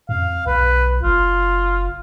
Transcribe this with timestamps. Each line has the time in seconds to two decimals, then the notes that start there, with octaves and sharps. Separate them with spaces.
0.09 F2 F5
0.47 B1 B4
1.03 F#1 F4